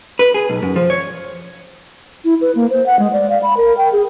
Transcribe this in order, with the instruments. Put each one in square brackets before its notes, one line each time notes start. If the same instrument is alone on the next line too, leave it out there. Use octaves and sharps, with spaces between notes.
[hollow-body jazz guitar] B4
G#4
B1
F#2
F3
C#5
[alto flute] E4
B4
A#3
C5
F#5
G#3
D5
F5
B5
A#4
G5
G#4